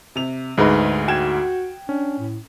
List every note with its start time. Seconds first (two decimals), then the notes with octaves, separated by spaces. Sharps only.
0.16 C3 F7
0.57 D2 G#2 G#3 D#4 B4
1.08 F#4 G5 G#6 E7
1.89 C#4 D4
2.19 A2